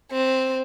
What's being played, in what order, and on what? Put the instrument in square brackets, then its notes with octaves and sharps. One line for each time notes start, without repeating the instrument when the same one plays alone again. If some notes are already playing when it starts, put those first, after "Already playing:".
[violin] C4